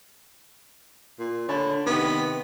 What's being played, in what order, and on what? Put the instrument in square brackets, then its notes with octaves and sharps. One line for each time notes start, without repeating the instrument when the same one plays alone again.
[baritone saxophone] A#2
[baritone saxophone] D3 [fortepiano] C#5 A5 B5
[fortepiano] C3 D#3 [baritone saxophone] B3